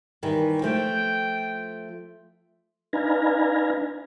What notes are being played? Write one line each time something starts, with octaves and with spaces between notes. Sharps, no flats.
D#3 E3 G3
F3 A3 C#5 G5
D4 D#4 B4 F5 G#5 A#5